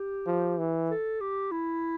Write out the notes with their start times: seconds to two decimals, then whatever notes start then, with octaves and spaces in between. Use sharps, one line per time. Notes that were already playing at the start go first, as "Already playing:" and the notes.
Already playing: G4
0.26 F3
0.58 E3
0.90 A4
1.20 G4
1.51 E4